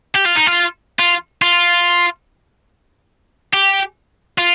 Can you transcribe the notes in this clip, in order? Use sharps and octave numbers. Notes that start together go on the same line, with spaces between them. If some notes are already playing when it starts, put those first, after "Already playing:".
G4
F4
D#4
F4
F4
F4
G4
F4